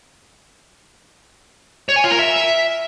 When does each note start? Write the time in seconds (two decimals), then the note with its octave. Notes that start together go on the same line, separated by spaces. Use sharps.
1.89 C#5
1.96 G#5
2.04 F4
2.11 A#4
2.19 E5